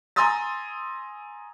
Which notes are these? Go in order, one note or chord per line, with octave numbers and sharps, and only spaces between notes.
G#5 A#5 C6 D#6 E6 A6